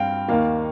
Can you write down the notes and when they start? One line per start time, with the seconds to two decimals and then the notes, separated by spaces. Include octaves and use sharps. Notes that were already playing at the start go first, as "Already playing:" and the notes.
Already playing: G2 C4 F5 G5
0.28 D#2 D#3 A#3 F5